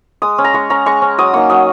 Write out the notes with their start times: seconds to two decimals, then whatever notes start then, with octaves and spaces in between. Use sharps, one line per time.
0.22 G#3 D#6
0.38 C#4
0.44 A#5
0.54 G#3 C#6
0.70 C#4 A#5
0.86 G#3 C#6
1.02 C#4
1.18 F#3 D#6
1.34 A#3 D#4 C#6
1.50 F#3 D#6